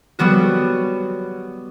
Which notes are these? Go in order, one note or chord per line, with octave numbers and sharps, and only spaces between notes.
F#3 G3 B3 F#4